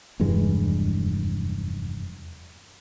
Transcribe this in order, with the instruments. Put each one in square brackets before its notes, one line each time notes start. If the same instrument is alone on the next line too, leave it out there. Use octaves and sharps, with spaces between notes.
[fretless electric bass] F1 E2 G2 G#3